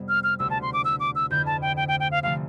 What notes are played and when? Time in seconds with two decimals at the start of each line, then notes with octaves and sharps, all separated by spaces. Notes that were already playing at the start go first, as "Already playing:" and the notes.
Already playing: F2 C3 G3 B3
0.09 F6
0.24 F6
0.39 E1 D2 C3 E6
0.50 A5
0.62 C6
0.73 D6
0.85 E6
1.00 D6
1.15 E6
1.30 F2 D3 A3 E4 G6
1.46 A5
1.62 G5
1.77 G5
1.88 G5
2.00 G5
2.11 F5
2.23 G1 C3 F3 A3 F5